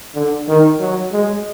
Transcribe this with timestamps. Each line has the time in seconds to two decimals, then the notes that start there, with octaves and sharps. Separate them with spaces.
0.15 D3
0.48 D#3
0.80 F#3
1.12 G#3